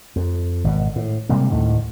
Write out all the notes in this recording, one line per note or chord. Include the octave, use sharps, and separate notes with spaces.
F2
G#1 B2
A2
C3 G3 G#3 A#3
D2 A2 D3 D#3